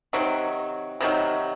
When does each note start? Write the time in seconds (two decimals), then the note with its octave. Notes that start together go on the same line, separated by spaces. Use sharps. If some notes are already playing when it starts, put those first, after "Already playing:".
0.13 C3 D#3 F#3
1.00 C3 D#3 F#3